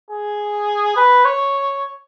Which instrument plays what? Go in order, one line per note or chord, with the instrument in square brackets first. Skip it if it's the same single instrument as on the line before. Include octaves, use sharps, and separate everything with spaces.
[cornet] G#4
B4
C#5